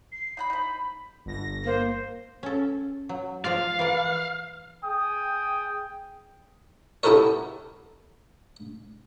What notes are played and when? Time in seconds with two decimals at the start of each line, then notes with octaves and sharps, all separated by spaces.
0.12 C7
0.37 D#4 F#5 B5
0.50 D#4 C5 B5
1.26 G1 A#6
1.66 A#3 C5
2.43 C#4 A4
3.09 F#3
3.44 F3 F4 D5 F5
3.79 E3 A#4 D5
4.84 G#4 G5 D#6
7.03 B3 E4 G4 A4 A#4 C#5